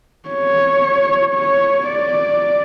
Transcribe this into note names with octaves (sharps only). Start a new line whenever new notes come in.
C#5
C#5
D5